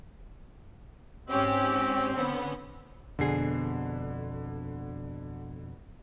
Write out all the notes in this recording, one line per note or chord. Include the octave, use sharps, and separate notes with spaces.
G#2 C4 C#4 G4
D3 B3 C#4
F2 B2 D3 G#4 C7